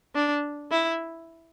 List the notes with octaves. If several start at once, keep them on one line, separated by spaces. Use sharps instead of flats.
D4
E4